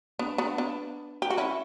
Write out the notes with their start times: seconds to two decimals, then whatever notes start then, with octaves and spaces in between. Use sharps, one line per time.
0.19 B3 D4
0.38 B3 D4
0.58 B3 D4
1.22 G4
1.30 F#4
1.37 C#4 E4